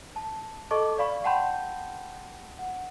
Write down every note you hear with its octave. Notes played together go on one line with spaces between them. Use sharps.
A5
A4 D#5 A5 C#6 D6
D5 F5 B5 C#6
F#5 G5 A5 B5 C6 G6
F#5